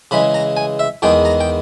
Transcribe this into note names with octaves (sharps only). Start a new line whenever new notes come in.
C#3 E3 G#3 B5
A#5
G#5
E5
E2 D#3 G#3 B3 G5
A#5
G5